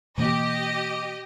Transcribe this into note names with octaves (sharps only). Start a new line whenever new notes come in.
B2 E3 A#3 G4 D#5